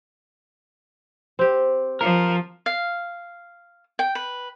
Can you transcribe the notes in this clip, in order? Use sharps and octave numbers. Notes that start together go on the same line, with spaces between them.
C4 G4
F3 A#4
F5
G5
B4